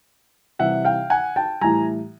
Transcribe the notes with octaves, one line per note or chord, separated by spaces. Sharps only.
C3 E3 G3 E5 F#5
F5 G5
F#5 G#5
G5 A5
A2 E3 G3 G#5 A#5